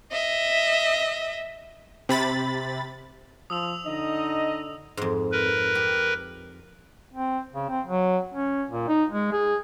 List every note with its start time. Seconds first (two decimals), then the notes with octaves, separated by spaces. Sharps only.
0.12 D#5 E5
2.09 C3 B5 A6
3.50 F3 D#6 E6 F7
3.87 D3 D#4 D#5
4.97 F2 G#2
5.32 A#4 B4
5.75 G4
7.13 C4
7.53 C#3
7.69 C4
7.86 F#3
8.34 C#4
8.71 A#2
8.88 D#4
9.11 G#3
9.32 G#4